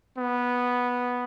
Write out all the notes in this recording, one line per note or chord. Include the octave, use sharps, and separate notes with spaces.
B3